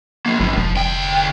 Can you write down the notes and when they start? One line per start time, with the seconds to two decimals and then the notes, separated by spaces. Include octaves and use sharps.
0.26 F3 A#3
0.40 G#1 A2 F3
0.57 F1 F3
0.76 D2 G5